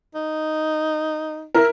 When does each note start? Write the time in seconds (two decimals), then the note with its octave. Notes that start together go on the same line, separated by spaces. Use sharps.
0.15 D#4
1.55 E4 A#4